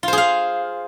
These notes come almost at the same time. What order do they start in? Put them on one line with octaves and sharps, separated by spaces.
F4 C5 G#4 F5